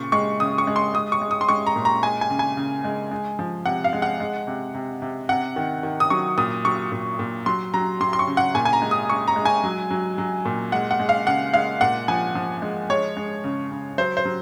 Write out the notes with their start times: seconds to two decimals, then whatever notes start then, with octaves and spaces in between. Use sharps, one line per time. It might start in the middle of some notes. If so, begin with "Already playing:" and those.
Already playing: A#2 C#3 C#6
0.12 G#3 C#6
0.40 C#3 D#6
0.58 C#6
0.67 G#3
0.76 C6
0.94 G#3 D#6
1.12 C#6
1.22 G#3
1.31 D#6
1.41 C6
1.49 G#3 C#6
1.67 A#5
1.76 A#2
1.85 A#5
2.03 G#3 G#5
2.21 G#5
2.30 C#3
2.39 G#5
2.57 C#3
2.84 G#3
3.11 G#3
3.39 F3
3.65 C3 F#5
3.84 F5
3.93 G#3
4.02 F#5
4.20 G#3
4.47 C3
4.75 C3
5.02 C3
5.29 C3 F#5
5.56 D#3
5.83 D#3
6.00 D#6
6.10 F#3 C#6
6.38 A#2 D#6
6.65 F#3 C#6
6.92 A#2
7.19 A#2
7.46 F#3 C6
7.74 F#3 A#5
8.01 F#3 C6
8.13 C6
8.19 C#6
8.27 C#3
8.37 F#5
8.55 A#2 G#5
8.65 G#5
8.73 A#5
8.82 G#3
8.91 D#6
9.10 G#3 C#6
9.28 A#5
9.36 G#3
9.45 G#5
9.64 F#3
9.91 F#3
10.18 F#3
10.45 A#2
10.72 G#3 F#5
10.91 F#5
11.00 G#3
11.09 F5
11.26 C#3 F#5
11.54 G#3 F5
11.81 A#2 F#5
12.08 F3 G#5
12.35 F3
12.62 G#3
12.90 G#3 C#5
13.17 G#3
13.44 C#3
13.71 C#3
13.98 F#3 C5
14.17 C5
14.25 F#3